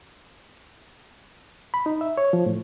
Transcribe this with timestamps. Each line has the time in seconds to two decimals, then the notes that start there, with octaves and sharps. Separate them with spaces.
1.74 B5
1.86 D#4
2.01 E5
2.17 C#5
2.33 F3
2.46 A2